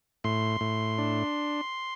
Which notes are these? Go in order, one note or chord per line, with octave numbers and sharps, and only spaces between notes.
A2 C6
A2
D4